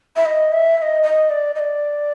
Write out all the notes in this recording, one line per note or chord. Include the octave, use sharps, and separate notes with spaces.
E5
D#5
E5
E5
D#5
D#5
D5
D#5
D5